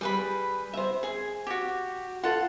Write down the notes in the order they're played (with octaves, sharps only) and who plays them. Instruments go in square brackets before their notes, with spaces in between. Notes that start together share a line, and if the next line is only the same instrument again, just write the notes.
[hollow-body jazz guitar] G3 [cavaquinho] G#4 B4 B5
[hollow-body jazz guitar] C5 E5
[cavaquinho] G#4 G#5
F#4 G4
[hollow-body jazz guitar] F4 [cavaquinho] A4 F#5